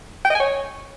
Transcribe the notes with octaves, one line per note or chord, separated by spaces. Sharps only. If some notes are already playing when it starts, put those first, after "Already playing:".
G5
D#5
G#5
C#5